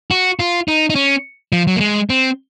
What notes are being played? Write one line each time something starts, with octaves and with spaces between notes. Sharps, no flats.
F#4
F4
D#4
D#4
C#4
F3
F#3
A#3
G#3
C4